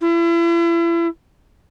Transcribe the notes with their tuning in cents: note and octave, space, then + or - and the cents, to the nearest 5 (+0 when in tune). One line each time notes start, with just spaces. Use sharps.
E4 +40